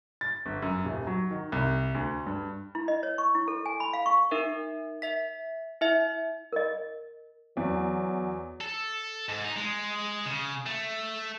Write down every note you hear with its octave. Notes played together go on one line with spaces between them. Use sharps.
A6
G1
F#2
D#1
F#3
D#3
C2
D2
G2
E4
D#5
C#5
C#6
E4
A4
G#5
B5
F5
C#6
D#4 A#4 E5
E5 B6
E4 E5
A#4 D#5
E2 F#3
A4
G#2
D#4
G#3
C#3
A3